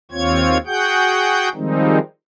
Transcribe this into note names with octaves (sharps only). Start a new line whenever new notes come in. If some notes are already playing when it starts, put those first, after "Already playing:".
D#2 C4 F4 C#5 G#6
F#4 G#4 F#5 G5 G6
D#3 F3 G3 G#3 C4 D#4